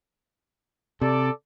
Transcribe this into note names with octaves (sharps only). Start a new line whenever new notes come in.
C3 A4 D5